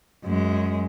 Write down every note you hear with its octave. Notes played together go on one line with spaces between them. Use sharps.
F#2 G#3